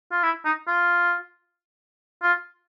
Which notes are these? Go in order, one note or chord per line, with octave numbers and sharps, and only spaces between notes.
F4
E4
D#4
F4
F4